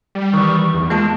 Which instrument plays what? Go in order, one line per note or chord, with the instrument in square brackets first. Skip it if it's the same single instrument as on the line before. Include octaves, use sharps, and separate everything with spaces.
[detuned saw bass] G3
[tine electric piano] D#3 E3 [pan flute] C#6
[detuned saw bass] E2
[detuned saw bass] G#3 [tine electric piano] A#3 F4 [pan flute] A5